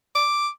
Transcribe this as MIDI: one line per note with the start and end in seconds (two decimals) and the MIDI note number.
0.15 0.49 86